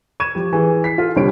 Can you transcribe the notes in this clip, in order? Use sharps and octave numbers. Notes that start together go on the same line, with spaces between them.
C#6 G#6 D#7 E7
F3 G4
E3 G#4
B6 C7
F4 A4
C2 D3 G3 C#5 D7